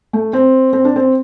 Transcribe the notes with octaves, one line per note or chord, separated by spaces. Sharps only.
A3
C4
C4
D4
C4